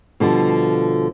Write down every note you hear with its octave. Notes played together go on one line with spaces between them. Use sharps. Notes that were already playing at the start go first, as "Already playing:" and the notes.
B2 D3 F3 G3